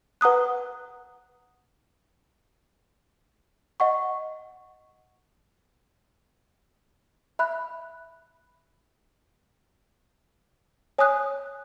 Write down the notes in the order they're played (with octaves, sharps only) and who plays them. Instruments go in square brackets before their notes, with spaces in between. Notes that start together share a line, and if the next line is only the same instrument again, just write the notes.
[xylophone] B4 F#5 A#5 D#6 F#6
D#5 F#5 C#6
E5 B5 F#6
C#5 G#5 D#6 F#6